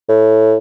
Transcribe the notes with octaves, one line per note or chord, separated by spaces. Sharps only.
A2